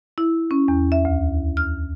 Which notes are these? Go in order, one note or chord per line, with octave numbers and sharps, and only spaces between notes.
E4
C#4
E2
E5
D2
F6